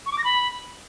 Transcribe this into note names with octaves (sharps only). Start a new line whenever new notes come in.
C#6
D6
A#6
B5